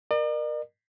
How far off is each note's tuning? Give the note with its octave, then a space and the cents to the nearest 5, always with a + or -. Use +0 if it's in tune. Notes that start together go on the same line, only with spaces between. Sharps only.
A#4 +15 D5 +45